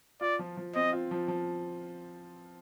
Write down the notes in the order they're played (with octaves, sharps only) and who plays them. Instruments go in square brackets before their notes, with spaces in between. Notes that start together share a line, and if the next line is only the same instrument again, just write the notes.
[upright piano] F4 [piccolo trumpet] D5
[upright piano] F3
F3
[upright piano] C4 [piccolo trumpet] D#5
[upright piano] F4
F3
F3